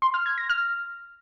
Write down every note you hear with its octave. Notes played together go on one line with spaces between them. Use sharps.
C6
F6
G#6
A#6
F6